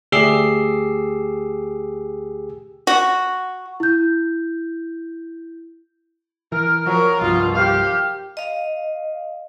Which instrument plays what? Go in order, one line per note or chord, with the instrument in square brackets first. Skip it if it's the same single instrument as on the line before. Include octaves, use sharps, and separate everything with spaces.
[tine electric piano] D2 G4 G#4 E6 C7
[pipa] F#4
[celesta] E4 G6
[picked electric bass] E3 [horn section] A#4
[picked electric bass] F3 [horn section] F#3 [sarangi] A#4
[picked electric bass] C2 G2 F3 [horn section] B2 [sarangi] F4
[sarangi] G4 [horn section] C5 F5
[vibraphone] D#5 F5